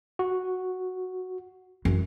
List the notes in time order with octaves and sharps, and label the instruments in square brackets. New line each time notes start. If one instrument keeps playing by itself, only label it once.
[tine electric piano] F#4
[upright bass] F#2 E3